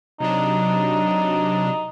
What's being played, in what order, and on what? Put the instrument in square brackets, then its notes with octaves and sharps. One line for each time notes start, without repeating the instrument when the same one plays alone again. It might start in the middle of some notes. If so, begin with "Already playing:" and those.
[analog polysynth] C3 F#3 D4 [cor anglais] D#4